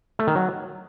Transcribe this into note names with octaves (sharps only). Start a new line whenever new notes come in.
A3
D#3
F#3